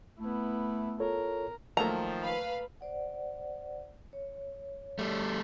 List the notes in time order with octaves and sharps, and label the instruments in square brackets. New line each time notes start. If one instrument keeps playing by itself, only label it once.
[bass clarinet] A3 [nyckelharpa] B3 E4
[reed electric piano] F4 A4 C#5 [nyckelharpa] A#4
[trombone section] D#3 F3 [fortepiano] F#3 A3 A#3 [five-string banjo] A#5
[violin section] B4 F5 B5
[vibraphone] C5 D5 F#5
C#5
[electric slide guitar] G3 A3